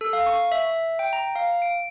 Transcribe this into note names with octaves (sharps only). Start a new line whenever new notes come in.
A4
F5
C#6
E5
G5
A#5
F5
D7